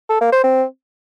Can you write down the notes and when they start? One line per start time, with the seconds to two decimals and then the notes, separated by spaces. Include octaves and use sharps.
0.10 A4
0.21 A#3
0.32 C5
0.44 C4